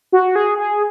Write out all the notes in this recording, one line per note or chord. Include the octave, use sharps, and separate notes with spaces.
F#4
G#4
G#4